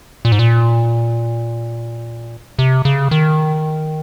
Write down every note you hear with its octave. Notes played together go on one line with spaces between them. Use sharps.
A#2
G#2
A#2
C3
C#3
D#3